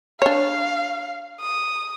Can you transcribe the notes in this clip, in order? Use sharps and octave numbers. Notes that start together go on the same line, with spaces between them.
D4 C#5 F5
D#6